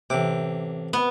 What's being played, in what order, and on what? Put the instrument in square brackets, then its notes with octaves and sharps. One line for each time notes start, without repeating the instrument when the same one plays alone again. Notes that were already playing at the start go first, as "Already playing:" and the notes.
[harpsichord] A1 D6 [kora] C3
[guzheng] B3